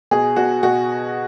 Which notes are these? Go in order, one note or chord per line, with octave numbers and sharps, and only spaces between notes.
B2 G#4
B2 F#4
B2 F#4